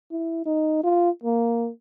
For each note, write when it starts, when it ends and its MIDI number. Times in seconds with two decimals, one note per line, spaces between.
0.11 0.43 64
0.45 0.80 63
0.83 1.10 65
1.23 1.69 58